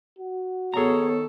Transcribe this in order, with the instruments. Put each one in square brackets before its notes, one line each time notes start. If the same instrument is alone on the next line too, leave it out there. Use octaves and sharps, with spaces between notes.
[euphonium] F#4
[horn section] D#3 A4 [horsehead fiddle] B3 C#5 [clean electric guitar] G#4 A#5